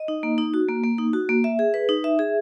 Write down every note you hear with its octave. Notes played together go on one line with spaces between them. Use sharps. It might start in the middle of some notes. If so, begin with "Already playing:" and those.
Already playing: D#5
D#4
A#3
D#4
F#4
A#3
A#3
D#4
F#4
A#3
E5
G#4
B4
D#4
E5
G#4